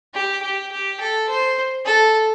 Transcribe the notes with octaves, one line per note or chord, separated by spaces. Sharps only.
G4
G4
G4
A4
C5
A4